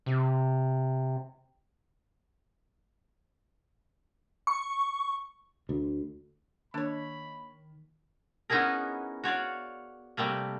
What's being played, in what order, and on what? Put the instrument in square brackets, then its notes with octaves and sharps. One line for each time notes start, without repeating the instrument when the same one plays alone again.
[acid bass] C3
[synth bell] C#6
[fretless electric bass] D2
[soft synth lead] D#3 [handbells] A#3 [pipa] D4 C#5 [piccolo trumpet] B5
[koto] B3 C#4 D#4 E4 G#4 A#4
F#4 C#5 D5 F5
C3 G3 A3 A#3